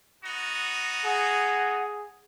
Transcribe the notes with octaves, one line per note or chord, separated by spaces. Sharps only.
B3 D#4 F#4
G#4 F#5